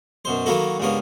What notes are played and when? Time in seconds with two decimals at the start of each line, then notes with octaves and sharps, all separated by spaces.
0.25 F#2 B2 C5
0.46 D#3 F#3 A#3 E4 F#4 A4
0.80 C#2 G2 A#3 B3 C#5